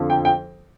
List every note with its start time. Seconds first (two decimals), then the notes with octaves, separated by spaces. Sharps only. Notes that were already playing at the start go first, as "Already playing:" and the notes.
Already playing: F2 D3 F3
0.10 G5
0.25 G5